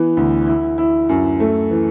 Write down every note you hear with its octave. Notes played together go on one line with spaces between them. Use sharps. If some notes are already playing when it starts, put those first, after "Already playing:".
Already playing: E3 B3
D2
E4
E4
F#2
A3
E3